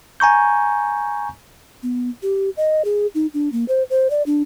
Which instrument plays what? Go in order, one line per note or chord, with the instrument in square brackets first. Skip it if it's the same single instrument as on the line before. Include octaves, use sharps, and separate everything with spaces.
[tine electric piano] G#5 A#5 C#6 G6
[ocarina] B3
G4
D#5
G#4
D#4
D4
A#3
C5
C5
D5
D4